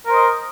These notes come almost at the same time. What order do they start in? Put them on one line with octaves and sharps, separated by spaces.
A#4 C5 D#5